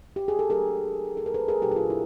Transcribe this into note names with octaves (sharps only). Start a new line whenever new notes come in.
G4
G#4
A4
F#3 A3 D4 G#4 A#4
A4
A#4
A4 B4
G#4 A#4
A#2 F#3 B3 D4 G4 A4
G#4
F4 G4
E4